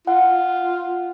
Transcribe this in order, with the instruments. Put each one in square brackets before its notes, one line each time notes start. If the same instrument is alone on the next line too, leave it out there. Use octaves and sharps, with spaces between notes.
[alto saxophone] F4 [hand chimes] F#5